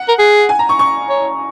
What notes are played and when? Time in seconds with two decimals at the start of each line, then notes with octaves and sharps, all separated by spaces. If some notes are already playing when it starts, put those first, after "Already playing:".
Already playing: F#5
0.08 A#4
0.19 G#4
0.49 G#5
0.59 A#5
0.69 C#6
0.79 C#6
1.10 C#5